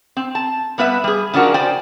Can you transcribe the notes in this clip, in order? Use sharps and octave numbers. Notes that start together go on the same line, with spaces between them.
C4
A5
G3 B3 B4 E5
G3 G#4
C#3 F3 D4 F#4 A#4
C5 D5 G5 G#5